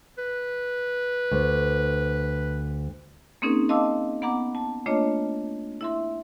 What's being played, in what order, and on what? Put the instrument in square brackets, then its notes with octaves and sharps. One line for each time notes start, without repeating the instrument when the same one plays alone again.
[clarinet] B4
[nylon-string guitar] D2
[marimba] A#3 C4 C#4 D#4 G#4 A#4
D#5 F5 A5 C6 D6 E6
B3 F#5 A#5 D6
A5
A3 A#3 D4 F4 C#5 D#5
E4 E5 C6